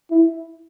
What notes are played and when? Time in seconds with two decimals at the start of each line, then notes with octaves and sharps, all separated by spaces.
0.11 E4